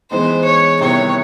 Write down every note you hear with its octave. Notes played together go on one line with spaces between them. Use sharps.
E3 G#3 B3 D#4 C5
C#5
C3 D#3 G3 B3 E4 C#5